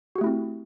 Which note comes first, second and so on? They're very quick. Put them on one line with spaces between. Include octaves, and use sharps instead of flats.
F#4 G4 A3 E4 C4